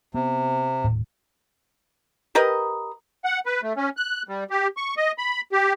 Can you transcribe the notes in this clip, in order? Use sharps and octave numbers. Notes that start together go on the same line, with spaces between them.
C3 B3
D#1 A2
G4 A#4 B4 D#5
F#5
B4
A3
C#4
F#6
G3
G4
C#6
D#5
B5
G4